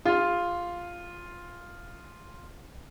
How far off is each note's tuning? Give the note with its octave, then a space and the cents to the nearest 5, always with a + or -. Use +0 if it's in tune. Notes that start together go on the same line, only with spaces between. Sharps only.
F4 +0 G#4 -40 F5 +0